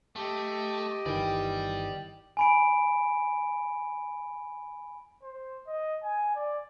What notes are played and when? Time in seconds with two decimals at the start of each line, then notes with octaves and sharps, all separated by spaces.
0.16 A3 G4 D#5
1.06 G1 D#3 E3 D5 G5
2.37 G#5 B5 D7
5.23 C5
5.67 D#5
6.03 G#5
6.35 D5